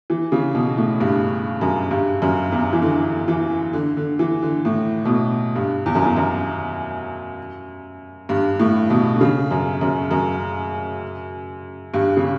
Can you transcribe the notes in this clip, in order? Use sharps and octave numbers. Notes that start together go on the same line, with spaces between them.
E3
C#3
B2
A2
G2
F#2
G2
F#2
E2
E3
D3
E3
D3
D3
E3
D3
A2
B2
A2
G2
E2
F#2
E2
F#2
G2
A2
B2
D3
C#3
F#2
F#2
F#2
G2
C#3